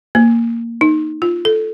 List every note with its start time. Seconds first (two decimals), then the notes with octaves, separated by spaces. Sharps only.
0.15 A#3
0.81 D#4
1.22 F4
1.45 A4